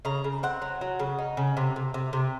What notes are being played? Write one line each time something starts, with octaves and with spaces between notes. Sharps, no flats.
C#3 A#5
C#3
C4 F#5
F#3
F#3
C#3
D#4
C#3
C3
C3
C3
C3